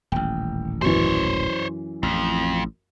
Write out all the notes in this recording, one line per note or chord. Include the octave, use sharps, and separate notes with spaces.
D#1 A1 G5
F#2 E3 C5 C#5
A1 F2